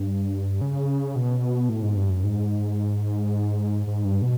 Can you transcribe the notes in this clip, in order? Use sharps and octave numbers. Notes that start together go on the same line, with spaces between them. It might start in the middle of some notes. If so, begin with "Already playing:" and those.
Already playing: G2
C#3
B2
A2
G#2
G2
F#2
G#2
G#2
G2
B2